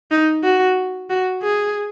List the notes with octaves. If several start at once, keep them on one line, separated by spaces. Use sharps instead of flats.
D#4
F#4
F#4
G#4